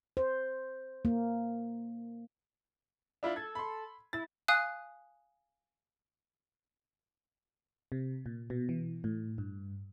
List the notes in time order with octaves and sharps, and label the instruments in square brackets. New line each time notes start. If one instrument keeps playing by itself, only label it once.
[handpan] C5
A#3
[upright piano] D4 E4 F4
[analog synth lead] A4 [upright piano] G#6
[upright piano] B5 C6
[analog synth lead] E4 [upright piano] A6
[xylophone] F5 G#5 D#6 F#6
[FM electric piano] C3
A#2
B2
E3
A2
G2